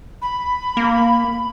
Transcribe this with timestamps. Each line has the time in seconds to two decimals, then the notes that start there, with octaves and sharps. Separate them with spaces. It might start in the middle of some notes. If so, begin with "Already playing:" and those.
0.21 B5
0.77 A#3